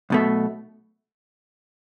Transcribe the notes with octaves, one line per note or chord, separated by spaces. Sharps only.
B1 B2 A3